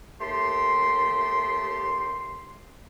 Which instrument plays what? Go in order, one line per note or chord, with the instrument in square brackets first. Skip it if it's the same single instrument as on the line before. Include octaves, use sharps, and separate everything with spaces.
[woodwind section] D#2 A3 G4 C6